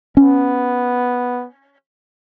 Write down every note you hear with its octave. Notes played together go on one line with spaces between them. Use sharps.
B3 C#4